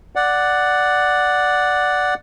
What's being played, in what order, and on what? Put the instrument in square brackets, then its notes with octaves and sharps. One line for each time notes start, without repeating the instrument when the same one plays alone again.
[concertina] D5 F#5